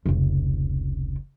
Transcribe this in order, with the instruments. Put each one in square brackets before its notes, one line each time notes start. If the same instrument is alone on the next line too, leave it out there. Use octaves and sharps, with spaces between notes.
[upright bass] F1 C#2